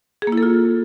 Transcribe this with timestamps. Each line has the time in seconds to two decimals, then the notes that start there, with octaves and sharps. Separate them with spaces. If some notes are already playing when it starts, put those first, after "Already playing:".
0.22 G#4
0.27 A#3
0.32 E4
0.37 A4
0.43 F4